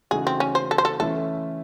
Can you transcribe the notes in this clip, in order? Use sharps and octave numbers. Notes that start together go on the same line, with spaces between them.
C#3 E3 A3 D#4 F#4 G#4
C4
C#4
C5
A4
C5
A4
E3 A3 C#4 E4 A4